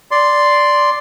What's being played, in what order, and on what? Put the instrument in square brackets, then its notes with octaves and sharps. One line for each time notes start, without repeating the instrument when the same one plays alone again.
[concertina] D5 C6